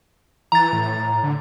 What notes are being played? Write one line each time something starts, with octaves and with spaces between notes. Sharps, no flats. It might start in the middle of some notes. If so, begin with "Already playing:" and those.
E3 A#5 A6
A2
D3